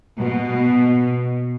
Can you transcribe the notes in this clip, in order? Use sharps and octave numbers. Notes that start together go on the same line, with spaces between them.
B2